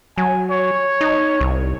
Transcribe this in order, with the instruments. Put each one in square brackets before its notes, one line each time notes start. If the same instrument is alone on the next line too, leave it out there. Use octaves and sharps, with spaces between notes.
[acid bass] F#3 [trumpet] G#5
[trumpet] C#5
[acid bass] D#4
C2